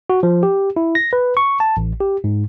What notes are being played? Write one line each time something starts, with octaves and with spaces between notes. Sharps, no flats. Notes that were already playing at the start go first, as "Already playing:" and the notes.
F#4
F3
G4
E4
A#6
B4
C#6
A5
A1
G4
G#2